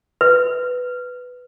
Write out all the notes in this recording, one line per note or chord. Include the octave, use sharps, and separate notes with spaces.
B4